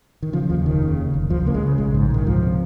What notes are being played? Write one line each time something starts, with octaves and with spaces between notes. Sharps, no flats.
D#3
C#3 F3
D#2 F3
F1 D#3
C#3
D#2
F1
C#2 F3
C#3 A#3
G#3
C#3
A#1 G#3
G#2
G#2 D#3
C#2 F3
C3